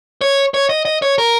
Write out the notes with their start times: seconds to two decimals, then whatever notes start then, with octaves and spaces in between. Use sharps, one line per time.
0.21 C#5
0.54 C#5
0.69 D#5
0.85 D#5
1.02 C#5
1.18 A#4